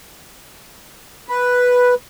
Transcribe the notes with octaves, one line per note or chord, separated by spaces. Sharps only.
B4